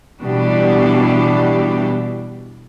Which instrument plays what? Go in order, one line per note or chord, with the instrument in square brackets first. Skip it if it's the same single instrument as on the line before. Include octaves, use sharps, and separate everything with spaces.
[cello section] B2 E3 G3 D4 G4